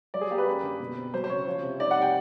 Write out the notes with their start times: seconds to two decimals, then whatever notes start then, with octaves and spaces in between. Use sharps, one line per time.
0.14 F#3 D5
0.21 G#4
0.30 A#3 G4
0.38 B4
0.47 F#2
0.63 D3
0.80 B2
0.97 C4
1.14 F#3 C5
1.24 C5
1.29 C#3 C#5
1.47 F3
1.63 C3
1.79 D#4 D5
1.91 G3 F#5
2.02 G5